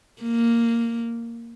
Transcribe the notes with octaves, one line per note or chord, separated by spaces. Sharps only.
A#3